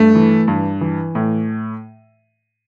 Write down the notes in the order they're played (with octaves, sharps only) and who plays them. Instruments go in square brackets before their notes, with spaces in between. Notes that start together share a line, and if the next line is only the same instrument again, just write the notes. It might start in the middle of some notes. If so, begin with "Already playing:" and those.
Already playing: [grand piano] G2 A3
E3
G2
E3
A2